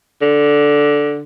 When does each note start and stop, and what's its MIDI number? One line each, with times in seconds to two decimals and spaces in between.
0.22 1.23 50